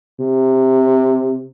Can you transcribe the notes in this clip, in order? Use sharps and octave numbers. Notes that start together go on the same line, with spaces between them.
C3